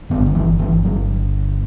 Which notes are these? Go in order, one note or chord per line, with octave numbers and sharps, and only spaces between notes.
G1 G2 D3 B3
D3
E3
E3
F#3